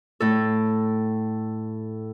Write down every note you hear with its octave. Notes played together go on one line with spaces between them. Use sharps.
A2 A4